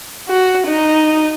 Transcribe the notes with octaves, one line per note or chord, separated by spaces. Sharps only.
F#4
D#4